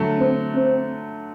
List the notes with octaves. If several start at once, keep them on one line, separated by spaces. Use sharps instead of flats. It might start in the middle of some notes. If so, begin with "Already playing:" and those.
Already playing: D3 F#3 A3
C4
C4